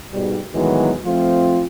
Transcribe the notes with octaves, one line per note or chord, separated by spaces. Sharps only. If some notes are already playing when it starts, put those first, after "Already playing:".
G#2 B2 G3
A2 D#3 E3 F#3 G#3 B3
F2 F3 A3 C4 F4